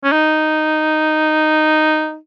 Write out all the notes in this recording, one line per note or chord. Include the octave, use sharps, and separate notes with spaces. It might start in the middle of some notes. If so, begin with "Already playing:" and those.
C#4
D#4